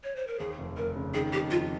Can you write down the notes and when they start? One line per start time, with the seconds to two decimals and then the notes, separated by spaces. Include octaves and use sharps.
0.04 C#5
0.16 C5
0.27 A#4
0.39 D#2 G#4
0.58 F1
0.77 F1 A#4
0.95 C#3
1.14 D#3 G#4
1.32 F2 G4
1.51 F2 F4